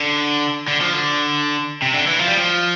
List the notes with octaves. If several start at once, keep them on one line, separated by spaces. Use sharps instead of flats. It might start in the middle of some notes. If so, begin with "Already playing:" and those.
Already playing: D3
D3
F3
D3
C3
D3
E3
F3
G3
F3